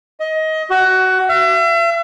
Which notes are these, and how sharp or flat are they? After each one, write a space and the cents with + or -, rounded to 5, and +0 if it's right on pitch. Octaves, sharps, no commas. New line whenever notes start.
D#5 +20
F#4 +20
E5 +40